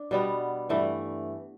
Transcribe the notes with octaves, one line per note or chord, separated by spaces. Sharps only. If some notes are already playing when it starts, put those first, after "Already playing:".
Already playing: D4
B2 G3 B3
G2 E3 A3